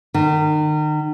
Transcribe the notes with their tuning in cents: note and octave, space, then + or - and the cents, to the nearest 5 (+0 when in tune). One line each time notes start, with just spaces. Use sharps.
D#3 -35